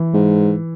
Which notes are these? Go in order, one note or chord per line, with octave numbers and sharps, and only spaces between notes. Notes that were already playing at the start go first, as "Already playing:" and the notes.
Already playing: E3
G#2